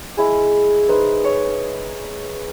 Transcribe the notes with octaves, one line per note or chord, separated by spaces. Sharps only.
G#3 E4 G#4
D#4 B4 C5 E5
C#5